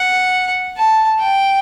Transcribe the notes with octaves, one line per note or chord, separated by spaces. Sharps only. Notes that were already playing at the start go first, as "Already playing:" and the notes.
Already playing: F#5
A5
G5